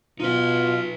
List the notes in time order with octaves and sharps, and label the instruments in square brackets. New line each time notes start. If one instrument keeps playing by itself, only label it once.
[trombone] B2 [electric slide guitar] D#4 B4 [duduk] F4